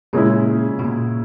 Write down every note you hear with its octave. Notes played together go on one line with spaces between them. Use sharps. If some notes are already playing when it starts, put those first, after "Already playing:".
A#2 C#3 G#3 C#4 E4
B2
A#2